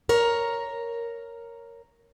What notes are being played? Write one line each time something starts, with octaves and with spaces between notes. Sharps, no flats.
A#4 C#5